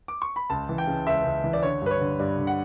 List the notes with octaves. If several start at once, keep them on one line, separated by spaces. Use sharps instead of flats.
D6
C#6
B5
C#2 A5
E3
G5
C#3
C#2 E5
C#2
E3
D5
D3 C#5
G2 B4
C#5
D3
G2 D5
D3
F#5